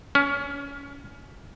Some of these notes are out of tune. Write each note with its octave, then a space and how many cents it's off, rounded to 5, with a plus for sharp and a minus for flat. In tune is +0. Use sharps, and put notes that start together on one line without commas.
C#4 +25